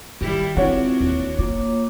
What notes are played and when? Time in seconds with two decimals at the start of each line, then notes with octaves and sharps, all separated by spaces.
0.21 D#3 G3 E4
0.57 E3 G#3 C4 D4 F4 F#4 C#5 F#5
1.01 D#2
1.39 A#3 F4 C#5 D6